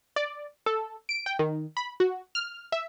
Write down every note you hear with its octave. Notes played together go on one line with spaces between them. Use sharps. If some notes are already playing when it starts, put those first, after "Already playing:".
D5
A4
D7
G5
D#3
B5
F#4
F6
E5